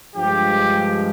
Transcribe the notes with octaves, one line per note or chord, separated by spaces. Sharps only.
G2 F3 G#3 G4